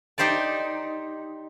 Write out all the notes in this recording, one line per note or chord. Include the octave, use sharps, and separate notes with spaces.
D#4 G4 C5 D5 A5